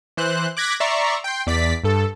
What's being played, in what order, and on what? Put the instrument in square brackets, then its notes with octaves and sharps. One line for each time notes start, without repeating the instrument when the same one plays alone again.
[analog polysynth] E3 C5 F#6
D6 F#6 G#6 A#6 B6
D5 E5 A#5 C6 C#6
G5 C6
E2 D5 B6
G2 A4